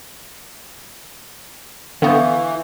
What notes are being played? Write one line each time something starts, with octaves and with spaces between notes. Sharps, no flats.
D3 E3 B3 F5 C#6 G6